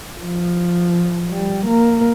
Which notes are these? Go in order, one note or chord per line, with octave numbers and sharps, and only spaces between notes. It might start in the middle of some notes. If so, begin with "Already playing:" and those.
F3
G3
A#3